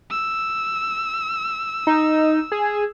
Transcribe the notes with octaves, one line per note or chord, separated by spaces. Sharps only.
E6
D#4
G#4